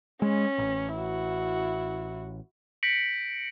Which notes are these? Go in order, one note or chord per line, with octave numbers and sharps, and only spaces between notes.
G#3 C#4
A1
E4 F#4
G6 A#6 B6 C#7 D7 F#7